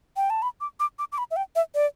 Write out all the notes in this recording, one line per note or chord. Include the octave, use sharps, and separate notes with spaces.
G5
A5
B5
D6
D6
D6
D6
B5
E5
G5
E5
D5